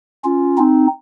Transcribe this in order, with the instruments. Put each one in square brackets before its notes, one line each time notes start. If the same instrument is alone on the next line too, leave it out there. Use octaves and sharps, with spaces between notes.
[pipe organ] C#4 F4
C4 D#4